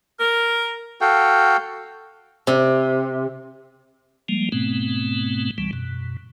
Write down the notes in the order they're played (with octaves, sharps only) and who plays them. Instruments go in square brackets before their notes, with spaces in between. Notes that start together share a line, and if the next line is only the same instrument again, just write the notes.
[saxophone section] A#4
[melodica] F#4 A4 F5 G5
[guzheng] C3
[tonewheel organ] F3 G3 G#3 A#3
G#2 B2 A3 B3 C4
C#2 E3 G3
F#2 B2